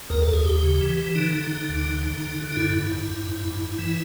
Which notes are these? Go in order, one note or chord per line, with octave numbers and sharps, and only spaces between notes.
D#2 A#4
A4
D#2
G#4
D#2 G4
C#3
E3
E3
D3 D#4
D3
D3
D2
D3
D3
D3
D3
D#4
G2 E4
G2
G2
G2
G2
G2
G2
E3